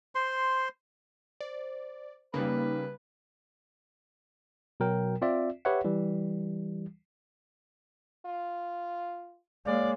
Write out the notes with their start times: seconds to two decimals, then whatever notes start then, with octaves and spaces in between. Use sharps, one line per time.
0.15 C5 C6
1.41 C5 D5
2.34 C#3 G3 A#3 D#4 B4
4.80 B2 F#3 A#4 G5
5.22 C4 F4 D5 E5
5.65 G4 B4 C#5 E5 F#5
5.85 E3 G3
8.26 F4
9.66 G#3 A#3 C#5 D5 F5